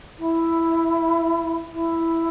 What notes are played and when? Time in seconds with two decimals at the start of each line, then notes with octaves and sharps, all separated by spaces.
0.19 E4
1.73 E4